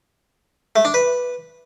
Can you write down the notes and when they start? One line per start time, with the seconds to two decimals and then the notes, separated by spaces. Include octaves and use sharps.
0.76 A3
0.85 D4
0.94 B4